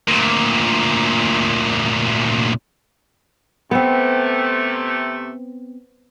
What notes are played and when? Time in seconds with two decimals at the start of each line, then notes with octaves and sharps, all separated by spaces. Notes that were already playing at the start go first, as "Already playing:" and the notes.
0.08 D2 A#2
3.71 C3 A3 B3 C4